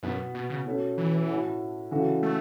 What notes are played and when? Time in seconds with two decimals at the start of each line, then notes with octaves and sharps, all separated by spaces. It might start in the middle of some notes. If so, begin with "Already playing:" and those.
0.03 F#2 B2 B3 F#4 B4
0.35 B2
0.50 C#3
0.65 B2 A3 C#4 F#4
0.98 E3
1.28 A2 A3 F#4
1.91 C#3 E3 A3 F#4
2.23 A3